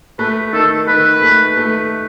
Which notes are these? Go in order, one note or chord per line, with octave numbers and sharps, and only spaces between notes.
A3 B4
D#3 A4
D#3 B4
A3
A3